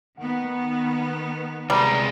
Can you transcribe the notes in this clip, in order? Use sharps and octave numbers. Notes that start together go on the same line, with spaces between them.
D#3 B3 F#5
C2 G3 G#3 A#5 A6 C7